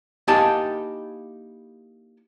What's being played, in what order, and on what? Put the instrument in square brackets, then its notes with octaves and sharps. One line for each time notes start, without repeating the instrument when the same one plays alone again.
[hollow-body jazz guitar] A#3 D#4 E4 G4 G#5 A5